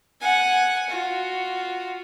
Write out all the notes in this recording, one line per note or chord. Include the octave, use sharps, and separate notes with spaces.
F#5 G#5
F4 F#4